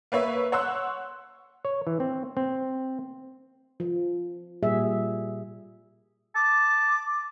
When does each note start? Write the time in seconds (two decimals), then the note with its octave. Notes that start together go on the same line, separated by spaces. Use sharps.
0.12 A#3 B4 C#5 E5
0.52 C#5 F#5 C6 E6 F#6
1.65 C#5
1.87 E3
2.00 C4
2.37 C4
3.80 F3
4.63 A#2 G3 G#4 E5
6.35 A5 D6